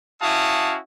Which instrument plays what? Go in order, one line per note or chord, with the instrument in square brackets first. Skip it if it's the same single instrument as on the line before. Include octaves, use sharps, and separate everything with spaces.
[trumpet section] C#4 E4 F#4 F5 A5 D#6